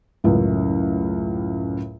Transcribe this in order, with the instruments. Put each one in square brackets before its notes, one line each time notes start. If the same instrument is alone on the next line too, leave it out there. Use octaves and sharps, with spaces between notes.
[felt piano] C#2 F#2 A2